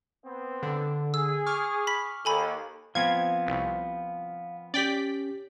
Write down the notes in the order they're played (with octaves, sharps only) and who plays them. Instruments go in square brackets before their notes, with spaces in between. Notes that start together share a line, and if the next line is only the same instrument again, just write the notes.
[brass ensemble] B3 C4
[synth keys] D3
[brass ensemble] G#4 [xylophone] E6
[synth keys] C#6 D6 F6
[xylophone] B5 B6
[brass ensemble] D#2 [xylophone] A4 G#5 B5
[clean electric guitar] F3 B3 C4 [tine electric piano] F5 [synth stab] G#6
[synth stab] C2
[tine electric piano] C#4 G4 [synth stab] D5 G5 B6